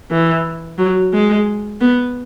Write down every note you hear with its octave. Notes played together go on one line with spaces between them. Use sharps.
E3
F#3
G#3
B3